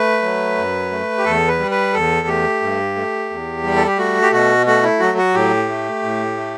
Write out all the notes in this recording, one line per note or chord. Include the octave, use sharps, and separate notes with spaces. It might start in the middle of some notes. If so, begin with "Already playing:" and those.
Already playing: A3 B4
F#3
F#2
A3
G4
E2 A4
B4
G3
B4
E2 A4
A3 G4
G2
A3
E2
G3
A4
G4
A3 F#4
G4
B2 F#4
A3 F#4
E4
F#3 F#4
F#4
A2 G4
A3
A2
A3